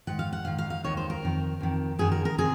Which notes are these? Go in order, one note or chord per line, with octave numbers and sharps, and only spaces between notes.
G#2 D#3 F#5
F5
F#5
G#2 D#3 F5
F5
F5
D#2 D#3 C#5
C5
A#4
F2 D#3
F2 D#3
F#2 D#3 G#4
A#4
A#4
C3 D#3 G#4